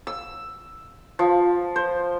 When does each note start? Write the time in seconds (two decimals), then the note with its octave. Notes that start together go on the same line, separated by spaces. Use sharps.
0.07 E6
1.19 F3
1.76 C5